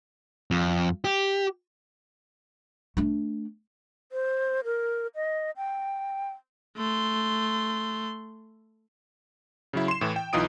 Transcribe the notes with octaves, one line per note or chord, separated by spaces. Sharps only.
F2
G4
A3 D4
C5
A#4
D#5
G5
A3 C6
C#3 F#3 E4
C6 E7
A2 E3
G5
B1 E3 D#4 F4 D#6 D7